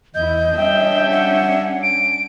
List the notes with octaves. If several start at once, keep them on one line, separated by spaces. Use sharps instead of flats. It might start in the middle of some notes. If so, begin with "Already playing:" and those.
E2 E4 D#5 G6
G3 C#4 D4 E5 G5
F#5
D7